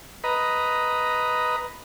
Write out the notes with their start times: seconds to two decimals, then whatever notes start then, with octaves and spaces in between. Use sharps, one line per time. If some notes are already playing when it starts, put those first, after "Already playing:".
0.24 B4 D#5 A#5